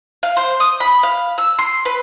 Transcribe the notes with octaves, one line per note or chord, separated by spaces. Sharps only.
F5
C5
D#6
B5
F5
E6
C6
B4